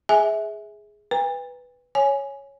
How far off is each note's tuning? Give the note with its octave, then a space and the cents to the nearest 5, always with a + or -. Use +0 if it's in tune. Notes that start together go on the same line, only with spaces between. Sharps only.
G#4 +0 E5 -20 G#5 +0
B4 +0 G5 +45 A#5 +0
C#5 +0 G#5 +5